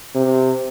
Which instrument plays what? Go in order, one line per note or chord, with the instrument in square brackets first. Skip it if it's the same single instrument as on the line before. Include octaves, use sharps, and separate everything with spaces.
[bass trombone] C3